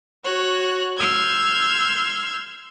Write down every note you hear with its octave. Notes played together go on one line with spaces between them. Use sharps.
F#4 C#5 F#6
C6 E6 F6 G6 G#6